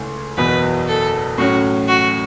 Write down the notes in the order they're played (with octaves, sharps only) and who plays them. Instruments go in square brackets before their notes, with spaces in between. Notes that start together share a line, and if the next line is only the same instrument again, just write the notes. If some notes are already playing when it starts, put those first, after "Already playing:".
Already playing: [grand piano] C#2 C#3 A3 C#4 E4
[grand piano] F#1 E2 B2 B3 [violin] B4
[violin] A4
[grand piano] A2 F#3 C#4 [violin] F#4
[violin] F#4